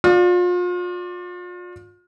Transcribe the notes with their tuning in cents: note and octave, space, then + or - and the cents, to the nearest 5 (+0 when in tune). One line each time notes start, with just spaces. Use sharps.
F4 +35 D5 +0